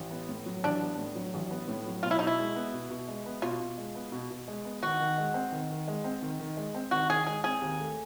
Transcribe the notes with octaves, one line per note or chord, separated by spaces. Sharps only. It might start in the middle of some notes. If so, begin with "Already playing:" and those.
Already playing: A1
B3
A2
F#3
A1 D4
B3
A2
F#3
A1
B3
A2
F#3
B2 F4
E4
B2 D#4
E4
G#3
B3
B2
B2
G#3
B3
B2 F4
B2
G#3
B3
B2
B2
G#3
B3
D#3 F#4
D#3
G#3
C4
D#3
D#3
G#3
C4
D#3
D#3
G#3
C4
D#3 F#4
D#3 G#4
G#3 G#4
C4 G#4
D#2
A3